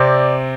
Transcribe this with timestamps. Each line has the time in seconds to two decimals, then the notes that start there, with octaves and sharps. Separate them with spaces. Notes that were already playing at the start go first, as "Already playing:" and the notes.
Already playing: C3 C4 D5